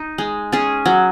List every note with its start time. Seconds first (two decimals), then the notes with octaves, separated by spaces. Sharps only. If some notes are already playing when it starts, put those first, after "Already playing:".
Already playing: D#4
0.18 G#3
0.52 C#4 G#4
0.85 F#3